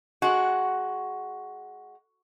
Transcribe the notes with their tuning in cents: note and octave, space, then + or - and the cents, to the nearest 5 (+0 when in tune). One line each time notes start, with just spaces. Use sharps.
G#3 +15 F#4 +5